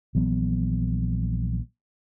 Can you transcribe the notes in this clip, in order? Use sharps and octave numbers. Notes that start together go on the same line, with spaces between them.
A#1 E3 F#3 B3